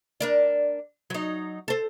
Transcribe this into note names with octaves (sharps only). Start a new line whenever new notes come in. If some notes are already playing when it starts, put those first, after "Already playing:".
D4 A#4 D5
F#3 D#4
A4 C5